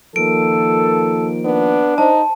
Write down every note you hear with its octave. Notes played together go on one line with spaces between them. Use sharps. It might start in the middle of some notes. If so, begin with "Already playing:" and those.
D#3 F3 A#3 A4 D7
B3 D4
D#4 C5 A5